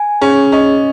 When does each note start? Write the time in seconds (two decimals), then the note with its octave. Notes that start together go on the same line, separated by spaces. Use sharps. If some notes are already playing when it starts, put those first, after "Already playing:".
Already playing: G#5
0.22 C#4 G#4
0.52 C#4 D#5